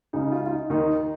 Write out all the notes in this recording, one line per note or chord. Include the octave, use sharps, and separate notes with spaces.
C#2 C#3 D#4
F4
F4
D#4
D#2 D#3 D#4